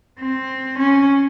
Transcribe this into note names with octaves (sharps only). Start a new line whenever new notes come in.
C4
C#4